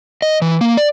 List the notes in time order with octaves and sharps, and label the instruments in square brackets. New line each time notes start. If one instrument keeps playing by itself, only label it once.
[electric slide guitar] D#5
E3
A#3
D5